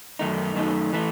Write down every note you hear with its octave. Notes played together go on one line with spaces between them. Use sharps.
F#2 D#3 A3 D#4
F#2 D#3 A3 D#4
E3 A3